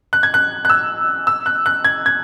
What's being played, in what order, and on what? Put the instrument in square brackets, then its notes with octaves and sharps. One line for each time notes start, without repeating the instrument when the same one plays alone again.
[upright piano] F#6
G#6
F#6
F#6
E6
E6
F#6
F#6
G#6
G#6